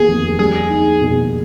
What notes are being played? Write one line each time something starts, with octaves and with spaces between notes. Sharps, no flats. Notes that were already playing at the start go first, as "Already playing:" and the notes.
Already playing: D#2 B3 G#4
F1
G3 G#4
D#4
B2